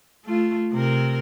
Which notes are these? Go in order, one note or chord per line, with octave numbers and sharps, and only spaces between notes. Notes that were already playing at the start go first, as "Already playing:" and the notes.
A3 F4
C3 A#4